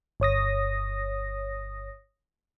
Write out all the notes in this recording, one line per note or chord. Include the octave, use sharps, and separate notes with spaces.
G1 C#5 D#6 A#6